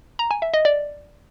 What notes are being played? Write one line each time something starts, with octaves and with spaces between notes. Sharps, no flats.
A#5
G#5
E5
D#5
D5